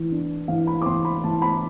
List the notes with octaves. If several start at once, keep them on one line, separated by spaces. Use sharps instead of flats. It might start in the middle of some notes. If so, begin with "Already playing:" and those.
Already playing: E3
D4
E3 F5
B5
D6
E3 C6
B5
E3 A5
B5